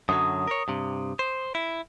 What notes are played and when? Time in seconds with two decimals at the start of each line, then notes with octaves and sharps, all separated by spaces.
0.09 F#2 D3 F#3 D#6
0.48 A#4 C#5
0.68 G2 C3
1.19 C5
1.55 E4